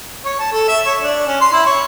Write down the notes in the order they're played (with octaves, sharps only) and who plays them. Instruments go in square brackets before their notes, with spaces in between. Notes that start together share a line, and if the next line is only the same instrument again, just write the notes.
[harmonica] C#5
A5
A4
E5
C#5
D4
C#4
C6
E4
C#5